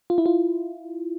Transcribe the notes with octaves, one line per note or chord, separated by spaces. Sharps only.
F4
E4
F4